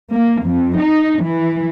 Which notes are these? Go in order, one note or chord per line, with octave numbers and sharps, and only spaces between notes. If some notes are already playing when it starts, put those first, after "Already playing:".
A#3
F2
D#4
E3